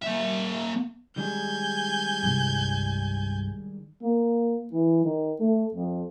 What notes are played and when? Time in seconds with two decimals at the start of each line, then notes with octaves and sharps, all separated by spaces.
0.02 A#3 E5
1.16 D#3 G3 G#3 G#5 G6
2.22 C2 G2
4.02 A#3
4.72 E3
5.04 D#3
5.40 A3
5.74 F2